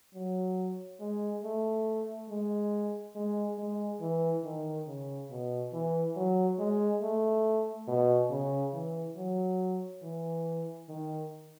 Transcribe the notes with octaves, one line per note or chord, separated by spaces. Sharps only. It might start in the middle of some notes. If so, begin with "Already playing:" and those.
F#3
G#3
A3
G#3
G#3
G#3
E3
D#3
C#3
B2
E3
F#3
G#3
A3
B2
C#3
E3
F#3
E3
D#3